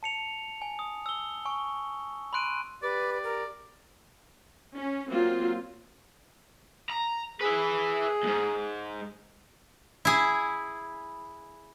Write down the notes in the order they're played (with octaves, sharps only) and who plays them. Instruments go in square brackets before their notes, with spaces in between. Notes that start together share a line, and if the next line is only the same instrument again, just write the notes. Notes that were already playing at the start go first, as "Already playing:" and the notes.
[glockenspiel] A5 C#7 F7
G#5
D#6
E6 G7
G#5 C#6
B5 C6 F#6 D7 D#7
[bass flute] G4 [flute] B4 [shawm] D5
[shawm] D5
[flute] A#4
[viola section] C#4
F#3 A#3 C4 F4
[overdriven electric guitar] A#5
[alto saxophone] G#4 [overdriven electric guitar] B4 E5
[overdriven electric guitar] D2 G#2
[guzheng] E4 G#4